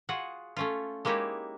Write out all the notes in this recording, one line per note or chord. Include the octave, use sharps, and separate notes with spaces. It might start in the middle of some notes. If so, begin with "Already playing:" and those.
F4 F#4 G#4 F#5
A3 C#4 F4
G#3 A#3 D#4 E4 G4 C#5